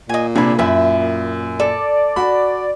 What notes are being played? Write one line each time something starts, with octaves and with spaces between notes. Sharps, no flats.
A#2 D#5 G#5
C3 A#3 D4 G#4 B5
F#2 E4 E5
A4 D5
F#4 B5